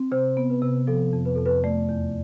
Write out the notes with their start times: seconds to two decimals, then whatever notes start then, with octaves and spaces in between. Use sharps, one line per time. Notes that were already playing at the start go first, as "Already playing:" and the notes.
Already playing: C4
0.12 C3 C5
0.37 B3
0.50 B4
0.62 C3
0.87 F3 A4
1.13 F2
1.25 B4
1.35 F2 A4
1.46 B4
1.64 A3 D5
1.89 E2